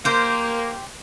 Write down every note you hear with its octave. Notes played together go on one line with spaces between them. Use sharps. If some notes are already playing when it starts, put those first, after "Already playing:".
A#3 G4 C5